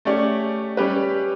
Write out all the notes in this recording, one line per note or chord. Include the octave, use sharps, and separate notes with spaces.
A3 C#4 G4 D5
G3 C#4 G4 B4